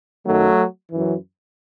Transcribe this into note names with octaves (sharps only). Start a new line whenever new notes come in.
F#2 D#3 F#3 A3
F#2 E3